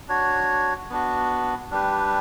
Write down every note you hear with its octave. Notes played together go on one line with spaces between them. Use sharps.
D4 F#4 C#5
B3 D4 F#4
G3 D4 G4 B4